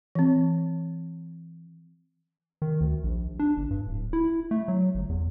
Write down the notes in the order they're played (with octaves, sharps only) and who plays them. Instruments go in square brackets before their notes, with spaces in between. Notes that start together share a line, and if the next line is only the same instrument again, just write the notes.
[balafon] E3 C4
[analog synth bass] D#3
D2
A#1
D4
G1
G2
D1
E4
A3
F#3
G1
E2